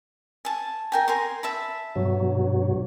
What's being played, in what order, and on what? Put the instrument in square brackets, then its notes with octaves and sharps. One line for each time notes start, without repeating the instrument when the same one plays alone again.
[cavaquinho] G#5 A5
A#4 G5 G#5
A#4 G#5 C6
E5 A5 B5
[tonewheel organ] G2 B2 F#3